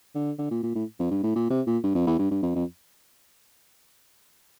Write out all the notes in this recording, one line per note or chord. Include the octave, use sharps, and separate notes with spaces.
D3
D3
A#2
A#2
A2
F2
G2
A2
A#2
C3
A#2
G2
F2
E2
G2
G2
F2
F2